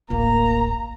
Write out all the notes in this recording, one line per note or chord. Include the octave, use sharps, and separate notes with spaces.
D1 A1 A#3 A#5